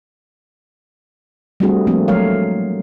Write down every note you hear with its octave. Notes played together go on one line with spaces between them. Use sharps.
G3 A3 C4 D4 F#4 G#4
F3 A3 A#3 C4 D4
F#3 G#3 A3 A#4 C#5 F5